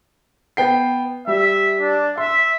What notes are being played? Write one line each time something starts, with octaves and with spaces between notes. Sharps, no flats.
B3 G5 C7
G3 E5
D4
E5 C6